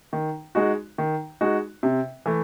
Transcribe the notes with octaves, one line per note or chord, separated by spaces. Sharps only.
D#3
G#3 D#4 F#4
D#3
G#3 D#4 F#4
C3
E3 A3